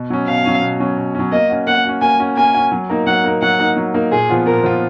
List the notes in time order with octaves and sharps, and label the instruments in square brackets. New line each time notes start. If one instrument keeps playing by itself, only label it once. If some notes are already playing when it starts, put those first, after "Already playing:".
Already playing: [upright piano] B2
F#3 C#4
[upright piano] B2 [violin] F5
[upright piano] F#3 C#4
B2
F#3 C#4
B2
F#3 C#4
[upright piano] A#3 [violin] D#5
[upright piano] C#4 F#4
[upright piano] A#3 [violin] F#5
[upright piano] C#4 F#4
[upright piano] A#3 [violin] G#5
[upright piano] C#4 F#4
[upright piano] A#3 [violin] G#5
[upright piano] C#4 F#4
F#3
A#3 D#4 A#4
[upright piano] F#3 [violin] F#5
[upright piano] A#3 D#4 A#4
[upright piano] F#3 [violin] F#5
[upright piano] A#3 D#4 A#4
F#3
A#3 D#4 A#4
[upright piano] A#2 [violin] G#4
[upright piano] F3 B3 F4
[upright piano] A#2 [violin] A#4
[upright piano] F3 B3 F4